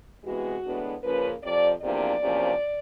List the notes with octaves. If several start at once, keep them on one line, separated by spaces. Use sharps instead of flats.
C3 E3 G#3 B3 F#4
A2 E3 G#3 B3 D4
C#3 F3 A#3 C#4 B4
F2 C3 F3 D5
E2 C3 F3 A#3 D4 D5
E2 C3 F3 A#3 C#4